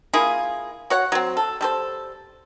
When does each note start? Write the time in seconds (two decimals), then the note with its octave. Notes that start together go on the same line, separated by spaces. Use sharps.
0.14 A#3 E4 F4 G#4
0.90 F#4 C#5 F#5
1.12 F#3 C4
1.37 A4
1.61 G3 A4 C5